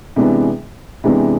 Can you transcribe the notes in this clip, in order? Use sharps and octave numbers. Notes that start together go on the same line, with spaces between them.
C3 E3 G#3 B3 D4
C3 E3 G#3 B3 D4